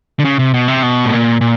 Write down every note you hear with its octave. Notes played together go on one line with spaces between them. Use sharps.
D3
C#3
C3
B2
C3
B2
A2
A#2
A#2